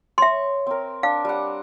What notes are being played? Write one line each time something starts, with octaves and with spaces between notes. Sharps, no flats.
C#5 E5 C6 C#6
C4 A#4
D4 F5
G3 F#5